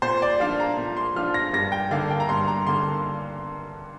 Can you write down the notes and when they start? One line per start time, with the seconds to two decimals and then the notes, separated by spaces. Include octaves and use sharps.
0.02 A#2 C5
0.22 D5
0.40 F3 D4 F4 F5
0.60 A#5
0.78 A#2
0.97 C6
1.16 F3 D4 F4 F6
1.34 A#6
1.53 G2 A#6
1.72 G5
1.91 D3 A#3 D4 F5
2.11 G5
2.20 A#5
2.29 G2 C6
2.48 A#5
2.67 D3 A#3 C6